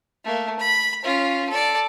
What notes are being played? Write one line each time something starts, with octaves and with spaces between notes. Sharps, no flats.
A3 A#3
B5
C#4 F4
A4 D5